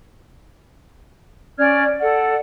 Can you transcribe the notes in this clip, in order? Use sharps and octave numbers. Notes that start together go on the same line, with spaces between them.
C#4 D5 F6 G#6
A4 D5 F#5